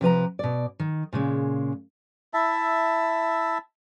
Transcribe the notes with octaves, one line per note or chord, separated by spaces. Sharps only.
C3 F3 B4 A#5
B2 D5
D#3
A#2 C#3 G#3
E4 E5 A5